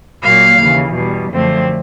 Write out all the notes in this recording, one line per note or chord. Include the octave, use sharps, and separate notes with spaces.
A#2 F#3 A#3 F5
D#2 C#3 E3
E2 B2 G3
F#2 D3 F3 A3 C4